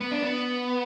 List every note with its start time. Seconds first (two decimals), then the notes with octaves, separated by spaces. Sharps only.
0.01 B3
0.11 D4
0.22 B3